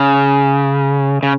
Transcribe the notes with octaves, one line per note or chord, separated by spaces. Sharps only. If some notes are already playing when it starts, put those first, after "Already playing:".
Already playing: C#3
C#3